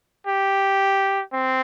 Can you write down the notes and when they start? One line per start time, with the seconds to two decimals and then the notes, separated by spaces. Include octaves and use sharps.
0.27 G4
1.33 C4